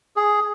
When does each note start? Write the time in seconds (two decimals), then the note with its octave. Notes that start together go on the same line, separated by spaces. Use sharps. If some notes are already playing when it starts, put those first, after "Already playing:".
0.16 G#4